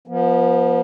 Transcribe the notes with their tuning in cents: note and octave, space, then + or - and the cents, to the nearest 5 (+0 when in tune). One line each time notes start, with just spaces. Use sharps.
F3 +5 B3 -35